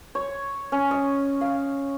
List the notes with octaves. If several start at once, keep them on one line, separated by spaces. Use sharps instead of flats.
C#5
C#4
D#5
F5